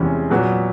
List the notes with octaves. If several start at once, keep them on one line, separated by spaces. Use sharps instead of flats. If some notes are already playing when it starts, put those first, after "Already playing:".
Already playing: E2 C3 E3 G#3 C#4
A#2 F#3 B3